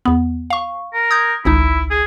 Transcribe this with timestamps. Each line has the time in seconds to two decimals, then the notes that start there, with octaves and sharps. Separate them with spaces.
0.05 E2 B3
0.50 F5 C#6
0.93 A#4
1.11 D#6 G6 G#6
1.45 G#1 C#2 D#4 E4
1.90 G#4